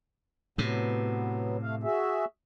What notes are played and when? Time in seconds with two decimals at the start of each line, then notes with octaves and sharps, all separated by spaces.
0.58 A2 C3 F#3 B3
1.62 A3 F5
1.83 F#4 G#4 E5